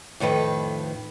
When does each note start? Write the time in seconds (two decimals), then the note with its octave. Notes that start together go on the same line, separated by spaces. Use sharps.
0.20 F2 A2 D#3 B4